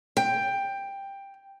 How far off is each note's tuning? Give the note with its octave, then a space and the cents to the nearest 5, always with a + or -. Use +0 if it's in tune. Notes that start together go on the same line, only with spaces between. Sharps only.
G5 +10